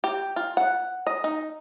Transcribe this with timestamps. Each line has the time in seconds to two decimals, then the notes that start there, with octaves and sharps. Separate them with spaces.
0.04 G4
0.36 F4
0.57 F#5
1.07 D#5
1.24 D#4